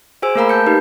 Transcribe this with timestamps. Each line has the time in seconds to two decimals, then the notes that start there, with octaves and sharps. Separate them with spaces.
0.22 F#4 G#4 C5 G#5 E6 D7
0.35 A3 A#3 A#4 F5 A#5 B5
0.49 A5 G6 C#7
0.67 D#4 G4 B4